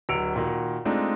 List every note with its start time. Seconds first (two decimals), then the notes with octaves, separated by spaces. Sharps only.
0.09 D1 F#3 E6 C#7 D7 F7
0.36 A#2 D#3 F#4
0.85 G#3 A3 C4 D4 D#4 F4